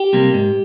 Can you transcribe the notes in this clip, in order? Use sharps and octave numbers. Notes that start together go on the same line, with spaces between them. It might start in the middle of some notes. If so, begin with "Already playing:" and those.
Already playing: G4
C3 G3 A#3
G#2